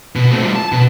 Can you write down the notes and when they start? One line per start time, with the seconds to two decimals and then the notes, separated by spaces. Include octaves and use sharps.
0.16 B2
0.31 A3 C4
0.42 G3 F4
0.56 A5
0.72 B2